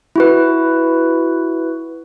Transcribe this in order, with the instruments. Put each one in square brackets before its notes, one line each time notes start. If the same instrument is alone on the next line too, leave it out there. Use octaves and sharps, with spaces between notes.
[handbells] E4 F#4 B4